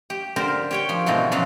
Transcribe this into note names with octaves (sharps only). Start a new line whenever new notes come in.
G4
D3 G4 A#4 C5
G4 C#5 G5
F3
G#2 B2 D3 E3 F#3
A#2 C#3 F3 F#3